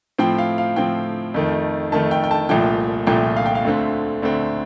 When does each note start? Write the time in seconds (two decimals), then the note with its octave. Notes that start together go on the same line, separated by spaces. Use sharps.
0.18 A2 F3 C4 G5
0.38 F5
0.58 F5
0.76 A2 F3 C4 G5
1.34 F2 D#3 A3
1.92 F2 D#3 A3 A5
2.11 G5
2.24 G5
2.31 A5
2.49 C2 A#2 F3 A3 G5
3.07 C2 A#2 F3 A3 G5
3.36 F5
3.46 G5
3.55 F5
3.65 D2 D3 A3 C4
4.22 D2 D3 A3 C4